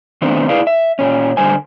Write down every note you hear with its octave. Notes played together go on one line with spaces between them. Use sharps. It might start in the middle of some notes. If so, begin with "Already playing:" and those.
D#3 A3 B3 C4 D4
E4 G#4 B4 D5 F5
E5
A#2 C#4
D3 G3 C5 G#5